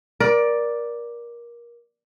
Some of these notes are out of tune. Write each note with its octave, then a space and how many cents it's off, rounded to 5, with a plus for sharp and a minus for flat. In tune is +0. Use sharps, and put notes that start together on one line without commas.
A#4 +25 D5 +0